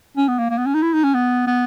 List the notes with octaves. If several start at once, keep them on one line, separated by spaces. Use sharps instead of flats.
C#4
B3
A#3
A#3
B3
C#4
D#4
E4
D#4
C#4
B3
B3